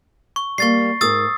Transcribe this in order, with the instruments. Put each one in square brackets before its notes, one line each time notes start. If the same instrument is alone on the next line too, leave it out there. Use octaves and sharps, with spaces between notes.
[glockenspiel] C#6
[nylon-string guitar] G3 A#3 [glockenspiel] C#6 A6 C7
[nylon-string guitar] G#2 G#4 A#4 [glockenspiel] D#6 E6 A6